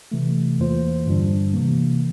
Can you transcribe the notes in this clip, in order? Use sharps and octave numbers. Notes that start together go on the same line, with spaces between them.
C3 E3 A3
E2 E3 A#3 F4 C5
G2 D3 G3 D4
C3 E3 A#3